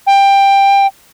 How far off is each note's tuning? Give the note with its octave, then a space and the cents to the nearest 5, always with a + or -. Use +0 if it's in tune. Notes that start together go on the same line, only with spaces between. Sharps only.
G5 +15